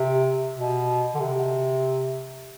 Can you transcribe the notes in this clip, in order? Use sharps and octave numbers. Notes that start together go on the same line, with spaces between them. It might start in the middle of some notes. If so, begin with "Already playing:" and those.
Already playing: C3
B2
D3
C3